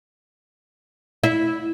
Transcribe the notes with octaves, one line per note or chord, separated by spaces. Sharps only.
E4